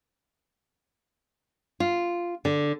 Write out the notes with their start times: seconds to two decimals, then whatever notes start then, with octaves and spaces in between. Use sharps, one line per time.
1.80 F4
2.45 D3